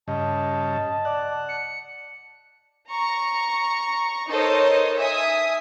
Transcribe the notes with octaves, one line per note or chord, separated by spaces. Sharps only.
G2 C#3 D#5 A5
D5 F#5
C#7
A#5 C#6
D#4 A4 A#4 C5 C#5 D#5
E5 G#5 D#6